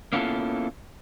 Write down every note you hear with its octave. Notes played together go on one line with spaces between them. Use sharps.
A#3 B3 C#4 E4 F4 A4